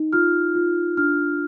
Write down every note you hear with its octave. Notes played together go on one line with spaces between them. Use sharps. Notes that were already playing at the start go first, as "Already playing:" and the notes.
Already playing: D#4
F4 F6
F4
D4 F6